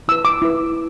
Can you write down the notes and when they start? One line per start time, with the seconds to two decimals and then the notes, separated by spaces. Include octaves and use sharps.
0.08 E4 B4 E6
0.25 D6
0.42 E4 B4